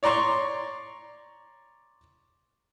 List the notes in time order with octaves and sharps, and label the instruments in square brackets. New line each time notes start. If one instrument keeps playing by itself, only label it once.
[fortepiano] C#5 D5 A#5 C6 C#6